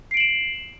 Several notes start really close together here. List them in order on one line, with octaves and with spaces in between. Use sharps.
C7 D7 F#7 E7